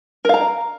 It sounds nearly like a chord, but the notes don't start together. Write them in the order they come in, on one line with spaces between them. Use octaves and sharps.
A#4 F5 A#5